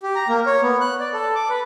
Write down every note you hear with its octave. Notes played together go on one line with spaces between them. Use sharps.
G4
A#5
A#3
C#5
B3
F#6
D5
A4
D6
B4